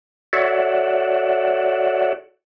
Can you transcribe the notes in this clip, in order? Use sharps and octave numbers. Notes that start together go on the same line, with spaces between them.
F#4 A4 C#5 D5 E5 F#5